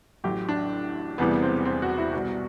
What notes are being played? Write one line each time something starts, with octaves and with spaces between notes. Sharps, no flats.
A1 A2 F#3 G4
D4
E1 E2 C3 E3 G3 B3
C4
C4
F#4
E4
C2 B2 G3 F#4